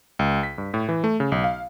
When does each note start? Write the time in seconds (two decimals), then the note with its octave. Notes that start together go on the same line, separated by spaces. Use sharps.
0.19 C#2
0.43 B6
0.58 G2
0.74 A2
0.89 E3
1.04 A3
1.20 C#3
1.32 B1
1.44 F5